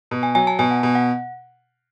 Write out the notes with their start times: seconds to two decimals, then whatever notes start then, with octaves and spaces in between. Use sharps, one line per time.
0.11 B2
0.23 G#5
0.35 F#3 G#5
0.47 A5
0.59 B2 G#5
0.71 F#5
0.83 B2
0.95 F#5